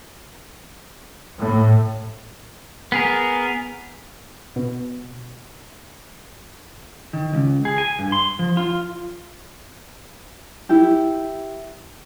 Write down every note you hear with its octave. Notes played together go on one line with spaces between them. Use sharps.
A2
B3 G#4 A#4
B2
D#3
C#2
G#4
G#5
G2
C6
F3
F4
E4 G4